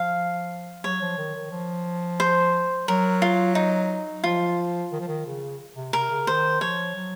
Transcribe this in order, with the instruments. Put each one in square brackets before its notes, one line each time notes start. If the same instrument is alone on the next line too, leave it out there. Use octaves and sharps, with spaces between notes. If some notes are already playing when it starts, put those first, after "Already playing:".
Already playing: [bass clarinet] F3 [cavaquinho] F5
[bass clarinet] F#3 [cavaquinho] C#5
[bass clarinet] F3
D#3
D#3
F3
[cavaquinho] C5
[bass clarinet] F#3 [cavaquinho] A#4
[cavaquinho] F4
D#4
[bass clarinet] F3 [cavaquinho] F4
[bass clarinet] D#3
F3
D#3
C#3
C3
[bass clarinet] C3 [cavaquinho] A#4
[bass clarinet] C#3
[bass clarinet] D#3 [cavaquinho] C5
[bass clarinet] F3 [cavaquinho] C#5
[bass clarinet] F#3